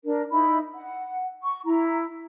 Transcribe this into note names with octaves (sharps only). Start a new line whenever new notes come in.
D4 A#4
D#4 E4 B5
F#5
C#6
E4 A#5